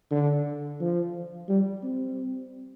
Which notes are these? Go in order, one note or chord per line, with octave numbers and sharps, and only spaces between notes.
D3
F3
G3
C4